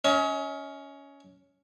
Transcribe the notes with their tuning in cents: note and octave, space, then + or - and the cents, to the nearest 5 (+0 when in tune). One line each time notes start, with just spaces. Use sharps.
C#4 +15 D#5 +40